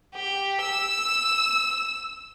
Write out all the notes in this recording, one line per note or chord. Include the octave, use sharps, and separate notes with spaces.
G4
E6